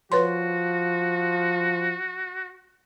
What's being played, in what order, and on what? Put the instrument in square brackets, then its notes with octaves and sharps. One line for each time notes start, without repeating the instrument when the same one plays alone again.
[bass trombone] F3 [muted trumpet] F#4 [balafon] B4 C#5 C6